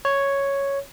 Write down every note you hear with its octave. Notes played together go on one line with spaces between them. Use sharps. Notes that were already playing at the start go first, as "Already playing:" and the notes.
C#5